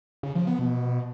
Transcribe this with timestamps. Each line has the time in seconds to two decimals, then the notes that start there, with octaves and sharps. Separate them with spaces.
0.23 C#3
0.35 F3
0.47 B3
0.59 B2